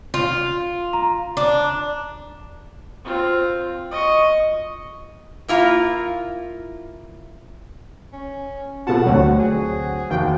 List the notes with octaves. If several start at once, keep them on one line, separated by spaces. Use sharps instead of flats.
F4
A#5
D4
C4 F4
D#5 C#6
A#3 E4 F4 A#5
C#4
B2 F4 A4 F#5 A5
D2 D3 F#3 C4 F#4
G#4
F1 D#2 F#4 G5